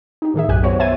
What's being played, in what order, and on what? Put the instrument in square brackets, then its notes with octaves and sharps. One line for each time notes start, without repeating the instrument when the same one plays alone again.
[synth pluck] D#4 G4
A2 D#3 G#4 E5
B1 F#2 G4 G#5 F#6
B3 F#4 C5 C#5
E5 G#5 C6 G#6 A6 D#7